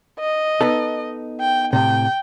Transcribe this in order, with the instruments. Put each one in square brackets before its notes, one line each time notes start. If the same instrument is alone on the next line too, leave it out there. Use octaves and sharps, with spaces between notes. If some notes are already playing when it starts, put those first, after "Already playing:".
[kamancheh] D#5
[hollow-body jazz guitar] B3 D#4 A4
[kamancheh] G5
[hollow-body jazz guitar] A2 C3 [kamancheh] G5